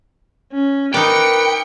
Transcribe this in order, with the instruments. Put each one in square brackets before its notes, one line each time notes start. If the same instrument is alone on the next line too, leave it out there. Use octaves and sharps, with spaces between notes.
[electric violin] C#4
[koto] D#4 D5 [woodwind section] A#4 B4 [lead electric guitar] G5 [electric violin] C#7